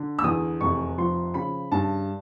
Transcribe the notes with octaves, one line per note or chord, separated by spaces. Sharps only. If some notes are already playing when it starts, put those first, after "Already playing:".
Already playing: D3
E6
E2 D#6
F1 C#6
F3 C6
C#3 B5
G2 A5